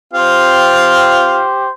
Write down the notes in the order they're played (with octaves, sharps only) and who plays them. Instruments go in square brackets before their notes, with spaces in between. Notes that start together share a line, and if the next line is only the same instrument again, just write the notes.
[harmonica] C4 F4 F5 [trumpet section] G4 C5